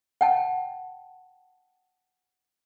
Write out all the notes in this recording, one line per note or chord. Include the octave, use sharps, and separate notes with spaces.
F#5 G5 A5